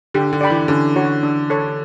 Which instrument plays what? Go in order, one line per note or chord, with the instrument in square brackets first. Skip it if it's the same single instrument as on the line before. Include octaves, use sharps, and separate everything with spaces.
[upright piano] D3 [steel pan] G4
[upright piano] D3
[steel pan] D5 G5 B5
[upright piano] E3
[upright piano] D3 [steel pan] C#4
[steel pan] F#4 C#5
D4
A4 C#5